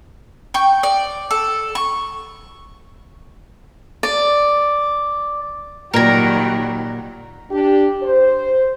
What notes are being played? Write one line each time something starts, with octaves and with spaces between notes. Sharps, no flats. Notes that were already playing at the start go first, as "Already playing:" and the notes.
G5 C#6
D5
A4
C#6
D5
A#2 D#3 F#3 G3 A#4 D5 A#5 G#6
D4 G4
C5